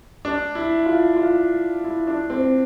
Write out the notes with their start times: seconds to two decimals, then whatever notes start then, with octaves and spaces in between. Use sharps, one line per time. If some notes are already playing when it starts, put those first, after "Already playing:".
0.25 D4
0.55 E4
0.86 F4
1.16 F4
1.84 E4
2.07 D4
2.30 C4